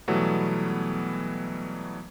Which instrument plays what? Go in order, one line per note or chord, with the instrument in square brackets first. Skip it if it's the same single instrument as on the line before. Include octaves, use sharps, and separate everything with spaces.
[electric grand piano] B2 E3 F#3 G3 A3 B3